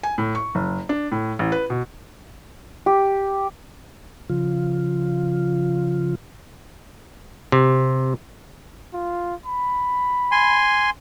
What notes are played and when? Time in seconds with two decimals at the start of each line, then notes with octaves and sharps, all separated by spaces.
0.03 G#5
0.18 A2
0.35 C#6
0.55 F#1
0.89 D4
1.12 A2
1.39 A1
1.52 B4
1.70 B2
2.86 G4
4.30 C#3 F3 F4
7.52 C3
8.93 F4
9.46 B5
10.31 G#5 C6